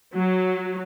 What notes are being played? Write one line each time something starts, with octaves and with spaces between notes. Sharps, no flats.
F#3